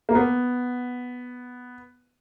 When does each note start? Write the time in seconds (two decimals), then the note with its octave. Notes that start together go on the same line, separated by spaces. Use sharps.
0.09 A#3
0.15 B3